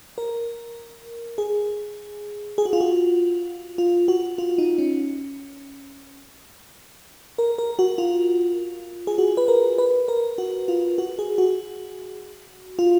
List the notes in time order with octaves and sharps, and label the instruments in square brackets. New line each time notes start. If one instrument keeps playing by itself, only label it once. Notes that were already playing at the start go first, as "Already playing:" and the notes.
[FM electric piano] A#4
G#4
G#4
F#4
F4
F#4
F4
F#4
F4
D#4
C#4
A#4
A#4
F#4
F4
G#4
F#4
B4
A#4
B4
A#4
F#4
F4
F#4
G#4
F#4
F4